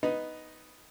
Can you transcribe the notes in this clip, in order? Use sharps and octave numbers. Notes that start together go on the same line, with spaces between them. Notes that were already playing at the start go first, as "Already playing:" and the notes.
B3 D#4 B4 D#5